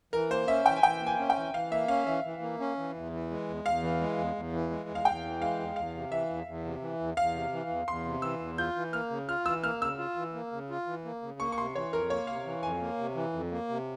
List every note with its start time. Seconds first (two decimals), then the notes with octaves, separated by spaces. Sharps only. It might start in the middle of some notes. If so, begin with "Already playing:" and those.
0.13 E3 A#4
0.30 A#3 C5
0.47 C#4 E5
0.66 E3 G5
0.76 G#5
0.83 E3 G5
1.00 A#3
1.07 G#5
1.19 C#4
1.30 G5
1.37 E3
1.53 E3 F5
1.72 A#3 E5
1.88 C#4 F5
2.06 E3 E5
2.24 E3
2.42 A#3
2.60 C#4
2.77 E3
2.95 E2
3.12 E3
3.30 G#3
3.48 E2
3.65 E2 F5
3.82 E3
4.01 G#3
4.18 E2
4.36 E2
4.52 E3
4.70 G#3
4.89 E2
4.95 F5
5.05 E2 G5
5.24 E3
5.41 G#3 F5
5.59 E2
5.76 E2 F5
5.94 C3
6.11 E3 E5
6.30 E2
6.47 E2
6.65 C3
6.81 E3
7.00 E2
7.17 E2 F5
7.34 C3
7.52 E3
7.69 E2
7.87 E2 C6
8.06 C3
8.22 E3 E6
8.40 E2
8.58 F4 G6
8.76 E3
8.93 A#3 F6
9.10 C#3
9.29 F4 F6
9.46 E3 E6
9.64 A#3 F6
9.81 C#3 E6
9.98 F4
10.16 E3
10.34 A#3
10.52 C#3
10.70 F4
10.86 E3
11.05 A#3
11.22 C#3
11.40 A#3 C#6
11.52 C#6
11.57 C3 C6
11.75 E3 C#5
11.92 F2 A#4
12.10 A#3 C#5
12.27 C3 F5
12.45 E3
12.63 F2 G#5
12.80 A#3
12.99 C3
13.15 E3
13.33 F2
13.51 A#3
13.69 C3